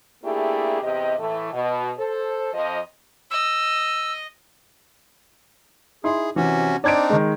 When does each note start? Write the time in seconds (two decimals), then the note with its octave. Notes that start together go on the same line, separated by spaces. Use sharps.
0.24 A3 A#3 D4 E4 G4 G#4
0.82 E2 C3 G4 D#5
1.18 A2 E3 A3
1.53 B2
1.98 A4 C5
2.53 F2 F3 C5 D#5
3.31 D#5 E6
6.04 D#4 E4 G#4 C6
6.36 C3 E3 C#4 F#4
6.84 C4 D4 D#4 D5 G#6 D7
7.10 D#3 G#3